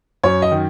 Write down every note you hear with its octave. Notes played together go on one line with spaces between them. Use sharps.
F#2 C#5
D#5
D#3